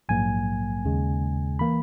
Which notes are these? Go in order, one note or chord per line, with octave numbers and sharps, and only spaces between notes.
A#1 G#2 F#3 A#3 G#5
D#2 C#3 G#3
E3 A#3 B5